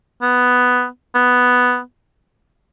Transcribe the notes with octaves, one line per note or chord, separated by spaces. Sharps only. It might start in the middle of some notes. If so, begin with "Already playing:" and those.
B3
B3